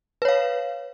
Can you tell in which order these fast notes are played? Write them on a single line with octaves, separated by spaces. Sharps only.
B4 C#5 F5